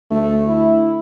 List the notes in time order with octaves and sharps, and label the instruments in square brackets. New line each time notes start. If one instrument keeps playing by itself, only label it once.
[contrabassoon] D2 [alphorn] A3
[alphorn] E4